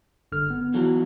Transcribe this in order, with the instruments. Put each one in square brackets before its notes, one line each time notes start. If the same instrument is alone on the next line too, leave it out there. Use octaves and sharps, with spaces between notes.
[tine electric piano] G1 D3 F6
B3
[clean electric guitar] E3 F#3